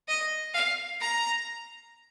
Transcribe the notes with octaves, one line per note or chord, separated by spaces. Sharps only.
D#5
F5
A#5